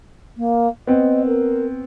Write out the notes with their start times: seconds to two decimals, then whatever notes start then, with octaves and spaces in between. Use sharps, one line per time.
0.37 A#3
0.87 B3 C4 D#5
1.26 A#4